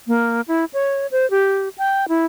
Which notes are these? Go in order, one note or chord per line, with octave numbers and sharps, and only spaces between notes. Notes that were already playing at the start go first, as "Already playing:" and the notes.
A#3
E4
C#5
C5
G4
G5
E4